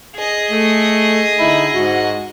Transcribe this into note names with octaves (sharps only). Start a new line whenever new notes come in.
G#4 D#5
A3
D3 D#4 E4
G#2 F#4